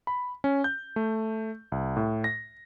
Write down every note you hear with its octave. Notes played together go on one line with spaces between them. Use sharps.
B5
C#4
G6
A3
C2
A2
A#6